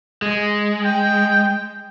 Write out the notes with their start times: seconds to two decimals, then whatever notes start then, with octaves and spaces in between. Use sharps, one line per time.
0.22 G#3
0.85 G5